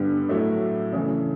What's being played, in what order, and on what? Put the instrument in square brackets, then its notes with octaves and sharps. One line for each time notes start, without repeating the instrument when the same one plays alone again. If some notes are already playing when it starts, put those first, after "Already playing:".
Already playing: [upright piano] G2 D3 G3 B3
A2 F#3 A3 E4
C#3 E3 A3